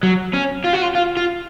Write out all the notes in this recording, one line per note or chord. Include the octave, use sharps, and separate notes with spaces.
F#3
C#4
F4
F#4
F4
F4
F4